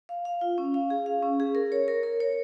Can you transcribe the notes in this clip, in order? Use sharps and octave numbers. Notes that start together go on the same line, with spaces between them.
F5
F5
F4
C#4
F5
G#4
F5
C#4
G#4
A#4
C#5
A#4
A#4
C#5